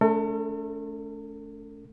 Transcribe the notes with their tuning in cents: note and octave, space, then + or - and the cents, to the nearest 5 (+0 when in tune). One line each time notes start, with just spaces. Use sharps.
A3 -20 C#4 +45 A4 +45